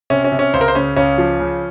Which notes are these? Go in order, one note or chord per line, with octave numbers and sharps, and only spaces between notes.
C3 C#4
C#4
C3
C#4
C#2 C5
A#4
C5
C#3 C#4
C#2 C#4
F3
C#3